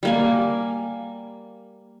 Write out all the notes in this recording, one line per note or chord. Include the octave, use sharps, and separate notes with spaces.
G3 A#3 G#5